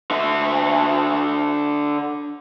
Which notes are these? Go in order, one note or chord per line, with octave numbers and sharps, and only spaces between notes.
D3 E5